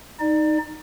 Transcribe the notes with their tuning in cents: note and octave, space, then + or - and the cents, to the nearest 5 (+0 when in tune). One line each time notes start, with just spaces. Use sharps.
D#4 +0 D5 +25